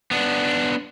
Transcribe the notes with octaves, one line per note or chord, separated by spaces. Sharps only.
B3 D4